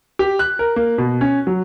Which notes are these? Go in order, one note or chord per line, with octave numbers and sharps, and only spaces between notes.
G4
F#6
A#4
A#3
B2
C#4
F#3